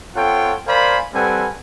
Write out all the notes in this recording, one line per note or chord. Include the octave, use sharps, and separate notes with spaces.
C4 F4 A4 C#5 F#5 G5
A#4 C5 D5 F5 G#5 B5
G3 C4 A4 B4 F#5 G#5